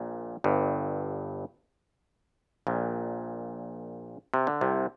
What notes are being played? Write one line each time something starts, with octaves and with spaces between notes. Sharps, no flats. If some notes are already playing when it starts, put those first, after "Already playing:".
Already playing: A#1 A#2
G1 G2
A#1 A#2
C3
D3
C2 C3